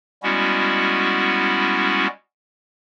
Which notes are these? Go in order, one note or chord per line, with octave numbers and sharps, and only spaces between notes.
G3 G#3 B3 C#4 E4 F#4